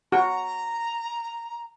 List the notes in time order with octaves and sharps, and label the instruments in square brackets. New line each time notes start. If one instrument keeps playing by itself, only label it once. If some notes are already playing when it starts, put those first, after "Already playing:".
[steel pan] F#4 [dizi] A#5